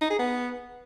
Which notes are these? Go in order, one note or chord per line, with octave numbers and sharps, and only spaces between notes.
D#4
G#4
B3